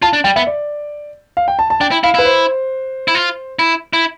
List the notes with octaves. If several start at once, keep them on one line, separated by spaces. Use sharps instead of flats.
F4 A5
D4
G3 G5
B3 E5
D5
F5
G5
A5
A5
D4 G5
E4
E4 F5
E4 B4
C5
E4
F4
E4
E4